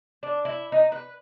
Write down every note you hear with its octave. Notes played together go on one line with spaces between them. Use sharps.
D4
E4
D#4
B4